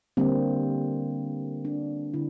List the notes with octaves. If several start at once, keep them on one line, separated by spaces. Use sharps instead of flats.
D3 G3 A#3 C4
D4
D3 E4